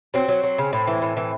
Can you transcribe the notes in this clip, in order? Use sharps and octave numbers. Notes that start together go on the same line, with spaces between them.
F#3 C4
F#3
F#3
C#3
A2
E3
A2
E3